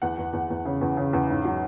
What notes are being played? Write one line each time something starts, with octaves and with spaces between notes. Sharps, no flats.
E2 F#5
E2
E2
E2
C#3
E2
C#3
E2
G#2
F#3